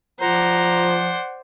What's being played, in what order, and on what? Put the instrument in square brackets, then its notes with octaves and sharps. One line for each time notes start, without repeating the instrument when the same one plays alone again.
[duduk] F3 [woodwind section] F4 A#5 [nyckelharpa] C5 D5 [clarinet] F#5